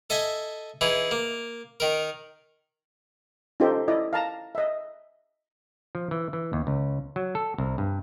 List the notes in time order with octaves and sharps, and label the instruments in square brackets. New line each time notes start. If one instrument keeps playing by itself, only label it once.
[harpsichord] A4 D#5 E5 G#5
E3 D#4 G#4
A#3
D#3 A#4
[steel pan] C#4 D#4 F4 G4 A4 C5
E4 D5 D#5
F5 A5 A#5
D#5 E5
[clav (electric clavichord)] F3
E3
E3
D#2
C#2
F#3
A4
C2
G2